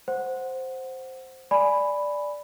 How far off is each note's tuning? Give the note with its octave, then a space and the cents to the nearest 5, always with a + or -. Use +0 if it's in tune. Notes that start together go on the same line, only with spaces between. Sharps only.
C5 +0 F#5 +0
D5 +0 G#5 +10 B5 +0